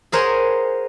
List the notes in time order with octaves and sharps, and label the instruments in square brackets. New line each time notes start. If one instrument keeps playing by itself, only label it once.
[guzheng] G#4 A#4 C5 C#5 F#5 G#5